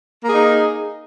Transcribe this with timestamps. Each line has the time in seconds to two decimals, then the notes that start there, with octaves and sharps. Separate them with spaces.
0.24 A#3
0.28 G#4
0.33 D#4